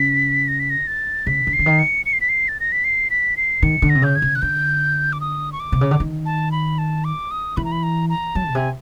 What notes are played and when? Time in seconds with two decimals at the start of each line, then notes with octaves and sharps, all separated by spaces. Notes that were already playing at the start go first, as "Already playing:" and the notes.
Already playing: C#3 B6
0.48 A#6
0.59 B6
0.70 A#6
0.87 A6
1.27 C#3 B6
1.47 D3
1.53 C7
1.59 D3
1.66 D#3
1.79 C#7
2.06 C#7
2.13 C7
2.21 B6
2.29 C7
2.48 A6
2.60 A#6
2.72 B6
2.84 C7
3.10 B6
3.37 C7
3.62 D#3 C#7
3.82 D3
3.90 A#6
3.95 C3
4.02 C#3 G6
4.16 G#6
4.22 C#3
4.35 F#6
4.42 D3 G6
5.13 D6
5.21 D#6
5.52 C#6
5.60 D6
5.72 C3
5.81 C#3
5.91 D3
6.00 D#3
6.26 A5
6.52 B5
6.78 A5
7.05 D6
7.31 D#6
7.57 E3 B5
7.64 A#5
7.72 B5
7.83 A#5
8.09 A#5
8.35 F#3 A5
8.49 B2
8.55 C3 G#5